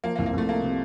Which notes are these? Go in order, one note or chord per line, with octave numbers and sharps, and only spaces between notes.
F3 A#3
A#3
C2
A#3
C2 A3
A3 A#3
C3